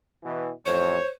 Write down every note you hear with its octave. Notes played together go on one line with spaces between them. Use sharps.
B2 E3
A1 F2 C5 C#5